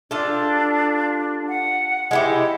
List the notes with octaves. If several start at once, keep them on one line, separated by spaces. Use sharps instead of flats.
D4 F4 G4 A4
F#5
G#3 E4 G4